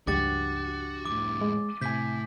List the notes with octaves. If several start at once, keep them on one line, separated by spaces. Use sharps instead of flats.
C#2 G2 F3 D4 F#4 G4 D6 A6
F2 A2 D6
G#3
A2 C3 A3 G#5 G6 B6